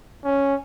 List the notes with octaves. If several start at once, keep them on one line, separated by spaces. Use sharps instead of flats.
C#4